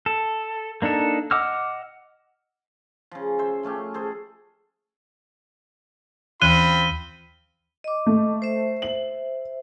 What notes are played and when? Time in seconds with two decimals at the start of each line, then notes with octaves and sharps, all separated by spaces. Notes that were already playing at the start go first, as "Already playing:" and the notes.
0.06 A4
0.82 A#3 D4 D#4 A4
1.31 D#5 F#5 D6 E6 F6
3.11 C#3 F3
3.39 C5 E5
3.63 F3 A3 C#4 G4
3.94 G#4 A4 C5
6.42 D#2 E3 C4 F4 B5 F#6 D#7 G7
7.84 D#5 D6
8.06 A3
8.42 C5 E5
8.82 F#7